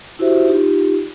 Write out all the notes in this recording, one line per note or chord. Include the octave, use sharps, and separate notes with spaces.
E4 F#4 G4 C5 E5
D#4 F4 G4